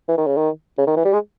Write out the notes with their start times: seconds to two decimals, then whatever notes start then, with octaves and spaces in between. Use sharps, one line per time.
0.08 E3
0.18 D#3
0.27 C#3
0.37 D#3
0.78 C#3
0.87 D#3
0.96 E3
1.05 G3
1.13 G#3